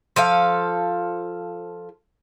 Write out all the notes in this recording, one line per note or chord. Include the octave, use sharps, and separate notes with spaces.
F3 A4 F5